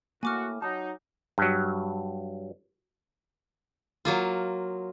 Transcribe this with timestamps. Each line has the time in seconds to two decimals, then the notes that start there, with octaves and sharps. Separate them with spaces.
0.23 A2 A#3 F#4 G#5 D6 F6
0.62 F#3 D#4 A5
1.38 G2 F#3
4.05 F#3 A#3 F4